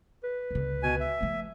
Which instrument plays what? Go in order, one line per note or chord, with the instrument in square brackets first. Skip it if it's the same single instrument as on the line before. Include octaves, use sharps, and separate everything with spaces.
[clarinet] B4
[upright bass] C#2 D3
[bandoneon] B2 G#5
E5
[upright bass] F3 A3